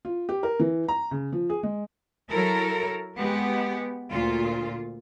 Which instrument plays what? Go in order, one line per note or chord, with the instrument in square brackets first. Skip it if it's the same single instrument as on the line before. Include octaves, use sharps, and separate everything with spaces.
[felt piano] F4
G4
A#4
E3
A#5
C#3
F3
G#4
G#3
[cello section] F#3 E4 A4 A#4
G#3 B3 G4
D2 A#2 F4